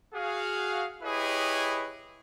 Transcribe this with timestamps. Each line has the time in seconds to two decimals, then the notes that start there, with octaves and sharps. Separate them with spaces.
0.15 F#4 G#4 F5
1.03 E4 G4 G#4 B4 C#5 D#5